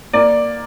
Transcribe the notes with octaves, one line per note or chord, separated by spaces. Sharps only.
A#3 D5